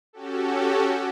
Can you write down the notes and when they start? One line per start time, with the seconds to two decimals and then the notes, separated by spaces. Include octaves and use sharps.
0.13 C#4 F#4 G4 A4